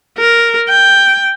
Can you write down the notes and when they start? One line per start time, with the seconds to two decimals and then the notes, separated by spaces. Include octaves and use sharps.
0.18 A#4
0.68 G5